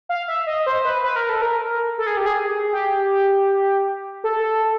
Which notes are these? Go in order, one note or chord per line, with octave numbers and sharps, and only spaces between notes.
F5
E5
D#5
C5
B4
B4
A#4
A4
A#4
A4
G#4
G4
G#4
G4
A4